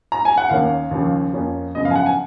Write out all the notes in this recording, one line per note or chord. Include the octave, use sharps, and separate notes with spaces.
A#5
G#5
F#5
D#2 D#3 A#3 C#4 F5
D#2 C#3 F3
F2 F3 A#3 C#4
F#2 C#3 F3 B3 D#5
F5
G#5
F#5
G#5